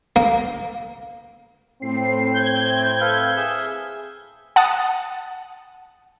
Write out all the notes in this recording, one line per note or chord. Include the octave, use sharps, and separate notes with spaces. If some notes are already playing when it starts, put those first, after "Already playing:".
A#3
A2 C4 C7
G6 G#6
A4 B4 F5
G#4 E5 E6
F#5 A5 D#6